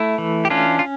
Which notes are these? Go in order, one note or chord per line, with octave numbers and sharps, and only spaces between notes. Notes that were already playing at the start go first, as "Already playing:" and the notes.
Already playing: A3 E4
E3
G4
C#4 D4 F4
F4